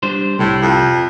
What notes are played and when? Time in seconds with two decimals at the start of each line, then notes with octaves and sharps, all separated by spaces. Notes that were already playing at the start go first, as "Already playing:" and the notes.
0.03 G3 D4 C5
0.39 C2 A2 G3
0.62 F2